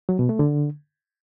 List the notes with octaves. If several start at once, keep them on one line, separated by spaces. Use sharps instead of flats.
F#3
B2
A3
D3